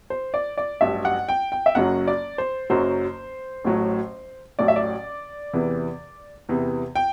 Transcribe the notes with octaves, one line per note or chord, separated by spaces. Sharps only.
C5
D5
D5
A1 G2 F#3 E5
F#5
G5
G5
E5
F#1 F#2 F#3 F#5
D5
C5
F#1 F#2 F#3 C5
A1 A2 F#3
A1 A2 F#3 D5
E5
D5
E2 C3 E3
E2 C3 E3
G5